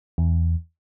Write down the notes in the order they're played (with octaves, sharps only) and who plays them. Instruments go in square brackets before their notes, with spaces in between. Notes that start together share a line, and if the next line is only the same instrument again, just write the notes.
[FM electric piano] E2